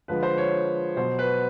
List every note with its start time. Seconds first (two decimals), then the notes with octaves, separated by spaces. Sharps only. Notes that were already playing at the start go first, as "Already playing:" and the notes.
0.08 D3 F3 G#3 B4
0.23 C5
0.37 C#5
0.97 B2 F#3 C5
1.19 B4